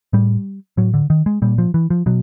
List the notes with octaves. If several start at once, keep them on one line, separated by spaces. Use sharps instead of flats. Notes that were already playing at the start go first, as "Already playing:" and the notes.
A2 G3
A2 F#3
D3
D#3
G#3
A#2 G3
F3
E3
F3
B2 F#3